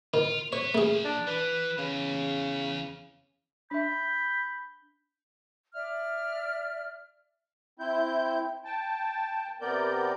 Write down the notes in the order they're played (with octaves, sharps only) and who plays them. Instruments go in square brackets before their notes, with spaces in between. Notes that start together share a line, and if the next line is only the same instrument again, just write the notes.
[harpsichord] D#3 [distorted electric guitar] F4
[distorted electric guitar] B3 [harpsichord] C#5
[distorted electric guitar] A#2 F3 [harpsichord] A3 G#4
[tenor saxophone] D4
[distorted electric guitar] E3 [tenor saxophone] B4
[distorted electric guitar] E2 [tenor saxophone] C#3
[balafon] D4 E5 [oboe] B5 [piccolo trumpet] G6
[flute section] D5 E5 F6
[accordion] C4 E4 G6
G5 A5
C3 B3 A#4 D5 G6